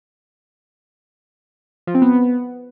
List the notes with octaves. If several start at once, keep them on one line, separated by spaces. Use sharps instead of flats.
F3
C4
B3